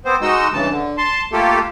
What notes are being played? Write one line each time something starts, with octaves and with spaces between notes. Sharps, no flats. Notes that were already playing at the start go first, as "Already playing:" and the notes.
B3 C4 C5
G#3 D#4 F#4 D#5 E6
G2 C#3 E3 A5
D3
A5 C6
A3 A#3 F4 G4 A4